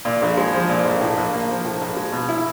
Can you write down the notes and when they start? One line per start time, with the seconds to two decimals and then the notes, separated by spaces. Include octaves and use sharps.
0.05 A#2
0.22 A#1
0.37 G#3
0.53 F3
0.69 A#2
0.86 A#1
1.01 A2
1.17 A#1
1.33 A#3
1.49 F3
1.65 A2
1.81 A#1
1.96 G#3
2.12 B2
2.29 E4